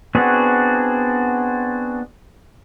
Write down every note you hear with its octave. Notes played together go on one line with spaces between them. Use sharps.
B3 C4 D4 F#4 G#4